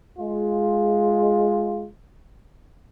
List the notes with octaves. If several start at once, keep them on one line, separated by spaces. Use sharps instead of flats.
G#3 F4